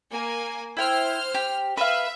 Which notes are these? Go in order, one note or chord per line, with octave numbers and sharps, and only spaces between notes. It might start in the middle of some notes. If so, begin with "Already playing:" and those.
A#3 G#5
E4 C5 G5 F6
G4
B4 E5 F5